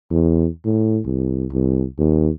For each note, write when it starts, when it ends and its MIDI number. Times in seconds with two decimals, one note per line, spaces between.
0.11 0.47 40
0.65 1.00 45
1.05 1.46 36
1.52 1.85 36
1.98 2.30 39